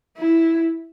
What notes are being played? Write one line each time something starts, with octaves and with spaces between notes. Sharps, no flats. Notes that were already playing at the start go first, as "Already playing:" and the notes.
E4